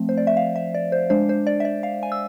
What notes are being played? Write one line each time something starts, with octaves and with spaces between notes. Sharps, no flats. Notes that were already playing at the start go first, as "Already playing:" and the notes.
Already playing: F3 A3 C4
C5
D5
E5
F5
E5
D5
C5
G#3 D4 C5
C5
D5
E5
D5
F5
G#5
E6